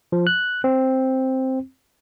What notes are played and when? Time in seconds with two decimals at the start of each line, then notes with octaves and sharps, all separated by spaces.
0.12 F3
0.27 F#6
0.64 C4